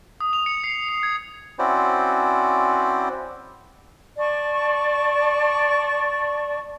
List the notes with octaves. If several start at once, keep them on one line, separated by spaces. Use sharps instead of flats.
D#6
F7
C#7
C7
C#7
G#6
C4 C#4 E4 F#4 C5 D5
D5 A5 C#6